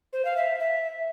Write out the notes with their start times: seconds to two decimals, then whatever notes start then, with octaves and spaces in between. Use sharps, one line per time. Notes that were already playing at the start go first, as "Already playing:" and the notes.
0.13 C5
0.25 F5
0.37 E5
0.60 E5